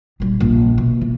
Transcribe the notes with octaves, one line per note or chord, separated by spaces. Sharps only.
A#2 G3
A#1
B2
E3